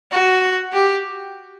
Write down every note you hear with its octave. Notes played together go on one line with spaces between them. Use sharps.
F#4
G4